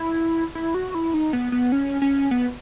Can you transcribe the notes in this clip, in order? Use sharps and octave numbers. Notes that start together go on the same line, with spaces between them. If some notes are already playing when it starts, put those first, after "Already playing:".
Already playing: E4
E4
F#4
E4
D#4
B3
B3
C#4
C#4
B3